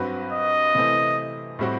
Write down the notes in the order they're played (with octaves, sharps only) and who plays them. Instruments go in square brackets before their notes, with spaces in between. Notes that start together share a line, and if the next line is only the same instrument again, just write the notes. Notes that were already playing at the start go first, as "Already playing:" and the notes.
Already playing: [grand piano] G2 F#3 C4 F#4 B4
[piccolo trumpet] D#5
[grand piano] C3 E3 A3 C4 E4
A2 G3 C4 F#4